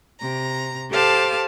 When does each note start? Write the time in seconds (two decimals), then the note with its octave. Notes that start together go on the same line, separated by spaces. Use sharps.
0.19 C3 A#5
0.90 G4 A4 C5 F5 A5 D6